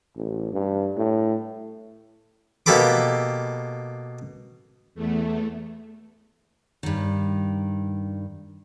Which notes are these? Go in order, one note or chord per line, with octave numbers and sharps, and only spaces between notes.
A1
G2
A2
B2 A#3 G4 A4 B5 D6
E2 A3
G2 D#3